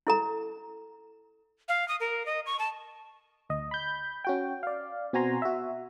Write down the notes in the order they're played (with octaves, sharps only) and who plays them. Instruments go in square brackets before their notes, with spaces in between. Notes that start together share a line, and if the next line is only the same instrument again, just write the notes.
[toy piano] E4 A4 A#5
[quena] F5
D#6
A#4
D#5
C#6
A5
[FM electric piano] D2 D#5
B5 G6
C#4 F#4 G5
D5 F5
B2 C4 F#4 G#5 A#5 C6
F#4 E5